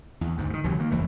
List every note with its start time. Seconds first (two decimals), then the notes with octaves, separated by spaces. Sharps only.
0.21 E2
0.38 D2 G#2
0.50 B2 D#3
0.64 C#2 C3 E3 F#3
0.79 D#3 A#3
0.91 F#1 F2 E3 A3